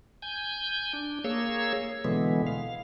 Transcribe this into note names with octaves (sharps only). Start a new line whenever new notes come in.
G#5 G6
D4
A#3 G#4 C#5 E6
B2 D3 E3 G#3 B3
F5